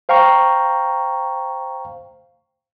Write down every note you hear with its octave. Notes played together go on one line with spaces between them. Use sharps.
C5 F5 G5 A#5 C#6